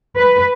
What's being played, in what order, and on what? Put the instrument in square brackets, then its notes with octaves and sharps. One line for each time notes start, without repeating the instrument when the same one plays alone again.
[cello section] B4